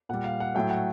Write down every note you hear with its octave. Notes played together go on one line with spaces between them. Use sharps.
A#2 G3 F#5
F5
F#5
A2 F#3 A3 G5
F#5